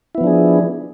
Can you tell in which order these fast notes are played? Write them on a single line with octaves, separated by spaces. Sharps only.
E4 B3 F3 D4 G#4